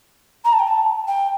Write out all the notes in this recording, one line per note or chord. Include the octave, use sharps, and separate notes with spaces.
A#5
A5
G5
A5
G5